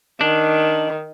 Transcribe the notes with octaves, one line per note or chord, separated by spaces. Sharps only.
D#3 D4